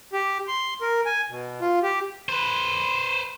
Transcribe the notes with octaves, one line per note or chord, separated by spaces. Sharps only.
G4
C6
A#4
G#5
B2
F4
G4
B4 C5